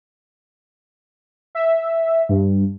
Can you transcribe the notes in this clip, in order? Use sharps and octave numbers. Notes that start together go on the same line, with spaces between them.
E5
G2